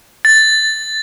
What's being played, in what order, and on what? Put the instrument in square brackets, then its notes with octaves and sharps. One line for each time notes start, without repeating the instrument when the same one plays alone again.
[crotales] A6